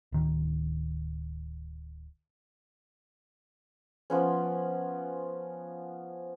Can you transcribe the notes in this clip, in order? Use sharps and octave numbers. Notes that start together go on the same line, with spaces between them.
D1 D#3
F3 B3 C#4